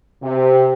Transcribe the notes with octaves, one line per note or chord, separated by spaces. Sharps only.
C3